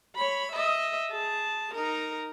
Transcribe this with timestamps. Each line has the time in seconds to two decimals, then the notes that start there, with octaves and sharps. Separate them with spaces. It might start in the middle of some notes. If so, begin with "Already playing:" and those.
0.16 C#5 B5
0.52 D#5 E5
1.11 G#4 A5
1.74 D#4 A#4